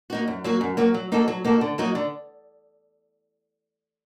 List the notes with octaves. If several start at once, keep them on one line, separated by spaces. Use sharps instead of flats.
A#3 D#4 F#4
F#2
F#3 A#3 F#4
F#2
F#3 A#3 F#4
F#3
A#3 D#4 F#4 A4
F#3
A#3 D#4 F#4 A4
D3
F#3 A#3 D#4 F#4
D3